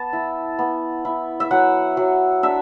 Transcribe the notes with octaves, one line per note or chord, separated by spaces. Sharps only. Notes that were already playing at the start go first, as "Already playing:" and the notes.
Already playing: B3 A5
E4
B3
E4
E5
F#3 F#5
F#3
D4 E5